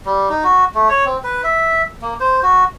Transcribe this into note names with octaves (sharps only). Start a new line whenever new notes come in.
G3
D#4
F#4
A3
C#5
C4
B4
E5
A#3
C5
F#4